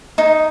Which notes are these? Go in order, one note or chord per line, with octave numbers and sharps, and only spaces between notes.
D#4